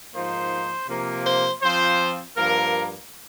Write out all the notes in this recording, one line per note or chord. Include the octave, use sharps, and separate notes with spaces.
G#2 F3 A#3 D#4 C5
C3 F3 A#3
C5
F3 C4 F4 C5
G2 F3 A#3 A#4